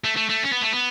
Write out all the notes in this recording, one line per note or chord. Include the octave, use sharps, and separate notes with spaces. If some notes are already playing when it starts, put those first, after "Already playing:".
A3
A3
A3
C#4
B3
A3
B3